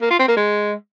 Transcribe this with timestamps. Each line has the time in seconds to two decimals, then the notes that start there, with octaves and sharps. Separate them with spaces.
0.02 A#3
0.10 F4
0.19 C4
0.28 A#3
0.37 G#3